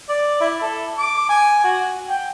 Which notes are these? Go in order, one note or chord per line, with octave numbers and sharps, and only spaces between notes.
D5
E4
A4
D6
G#5
F#4
G5